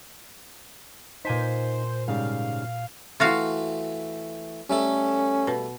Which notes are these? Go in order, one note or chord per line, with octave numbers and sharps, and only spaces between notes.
A#2 D#4 C5 G#5 B6
G#2 C#3 G3 F5
E3 A3 F4 F#4 F5
G3 A3 C#4 A4
B2